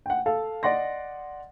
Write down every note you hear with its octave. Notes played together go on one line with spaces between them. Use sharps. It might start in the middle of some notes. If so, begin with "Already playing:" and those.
F#5 G5
A4 F5
D5 D#5 F#5 C6 A#6